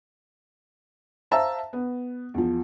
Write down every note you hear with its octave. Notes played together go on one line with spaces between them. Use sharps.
C5 E5 F5 A5 A#5 E6
B3
E2 F3